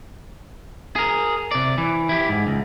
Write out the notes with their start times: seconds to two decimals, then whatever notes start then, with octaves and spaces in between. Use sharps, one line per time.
0.96 G#4 A#4
1.52 C3 D5
1.78 E3
2.09 E4 G4
2.29 G#2
2.47 C#2